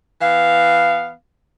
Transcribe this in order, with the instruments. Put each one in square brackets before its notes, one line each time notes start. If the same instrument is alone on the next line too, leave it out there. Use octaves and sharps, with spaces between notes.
[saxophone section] E3 B3 F5